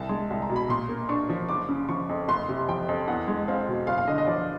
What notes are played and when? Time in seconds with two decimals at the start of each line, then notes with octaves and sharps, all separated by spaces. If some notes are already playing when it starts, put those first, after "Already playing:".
Already playing: C2 A5
0.09 G#3
0.30 C2
0.42 A#5
0.50 B2
0.56 B5
0.69 A#2 C6
0.89 A#3
1.09 D4 C#6
1.29 F3
1.48 F#1 D6
1.69 C#3
1.89 F3 C#6
2.09 F2
2.28 F#1 C6
2.49 C3
2.68 F3 G5
2.89 F2
3.07 E2 F#5
3.28 G#3
3.48 C4 F5
3.68 B2
3.87 F#1 F5
3.98 F5
4.07 D3 D#5
4.18 D#5
4.27 F3 D5